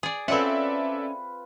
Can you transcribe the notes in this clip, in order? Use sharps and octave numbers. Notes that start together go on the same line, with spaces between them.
G#4 D5
C4 C#4 F4 A4 B4 D5 E5 F#5